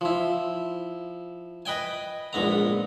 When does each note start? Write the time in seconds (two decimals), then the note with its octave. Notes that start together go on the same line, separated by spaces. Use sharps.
0.01 F3 E4
1.66 B4 D#5 G5 G#5
2.33 A#1 G#2 B3 A#5